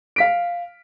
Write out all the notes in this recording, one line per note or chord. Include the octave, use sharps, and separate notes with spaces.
F5 B6 D7